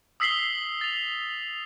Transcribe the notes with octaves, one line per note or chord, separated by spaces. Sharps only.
D#6 E6 B6 C7 F#7 G7
A6 F7